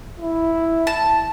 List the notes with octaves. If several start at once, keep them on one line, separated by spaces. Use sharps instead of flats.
E4
A5